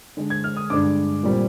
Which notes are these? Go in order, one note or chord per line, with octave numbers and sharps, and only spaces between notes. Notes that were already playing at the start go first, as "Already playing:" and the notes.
D3 G#3 D4
G#6
F6
D#6
G2 D3 G#3 D4 D6
A#2 G3 C4